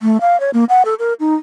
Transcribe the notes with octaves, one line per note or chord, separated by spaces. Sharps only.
A3
F5
C#5
A#3
F#5
A4
A#4
D#4